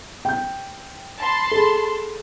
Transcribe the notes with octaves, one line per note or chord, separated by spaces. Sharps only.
G5 G6
A5 B5 C6
G#4 A4